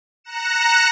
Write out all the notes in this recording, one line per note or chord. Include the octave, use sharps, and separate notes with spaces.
A#5 F#6 A#6 C#7 E7